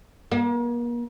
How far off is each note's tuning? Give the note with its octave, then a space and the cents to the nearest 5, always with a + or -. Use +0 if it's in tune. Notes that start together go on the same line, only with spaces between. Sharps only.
A#3 +40